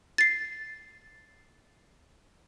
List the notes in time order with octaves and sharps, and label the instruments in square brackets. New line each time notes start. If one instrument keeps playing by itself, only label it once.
[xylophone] A6 C7